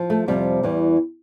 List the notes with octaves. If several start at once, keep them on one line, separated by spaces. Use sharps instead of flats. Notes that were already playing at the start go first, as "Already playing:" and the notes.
Already playing: F3
A3
F2 C3 F3 G3
E2 E3 G3